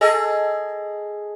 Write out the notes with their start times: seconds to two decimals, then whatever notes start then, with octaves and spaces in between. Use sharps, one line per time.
0.01 G#4 A4 D#5